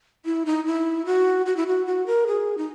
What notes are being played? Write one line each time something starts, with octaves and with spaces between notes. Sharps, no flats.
E4
D#4
E4
F#4
F#4
E4
F#4
F#4
A#4
G#4
D#4